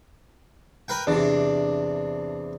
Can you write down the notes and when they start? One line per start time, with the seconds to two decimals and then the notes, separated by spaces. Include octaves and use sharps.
0.88 A#4 B4 G5
1.07 E2 C3 D4